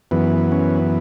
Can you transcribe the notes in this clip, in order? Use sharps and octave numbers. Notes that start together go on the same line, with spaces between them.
F#2 E3 B3
C#4